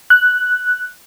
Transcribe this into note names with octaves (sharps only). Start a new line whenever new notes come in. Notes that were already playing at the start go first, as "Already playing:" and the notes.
F#6